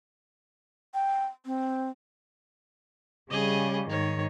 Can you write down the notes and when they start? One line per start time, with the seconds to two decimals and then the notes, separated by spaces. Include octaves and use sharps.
0.94 G5
1.46 C4
3.30 C#3 G3 G#4 D#5
3.90 G#2 D#3 C#5